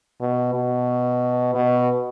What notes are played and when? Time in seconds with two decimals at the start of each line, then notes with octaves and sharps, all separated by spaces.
0.21 B2
0.54 B2
1.55 B2